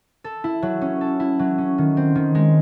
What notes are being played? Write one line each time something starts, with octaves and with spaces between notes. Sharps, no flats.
A4
E4
F#3
C#4
A4
E4
F#3
C#4
D#3
C4
D#3
G#3